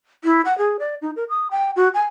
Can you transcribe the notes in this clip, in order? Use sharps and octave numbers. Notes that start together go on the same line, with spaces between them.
E4
F#5
G#4
D5
D#4
A#4
D#6
G5
F#4
G#5